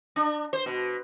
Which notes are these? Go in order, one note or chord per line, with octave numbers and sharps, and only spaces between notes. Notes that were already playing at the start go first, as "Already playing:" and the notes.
D4
C5
B2